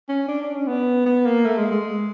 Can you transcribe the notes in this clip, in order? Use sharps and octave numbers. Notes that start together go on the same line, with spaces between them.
C#4
D4
D4
C#4
B3
B3
A#3
A3
G#3
G#3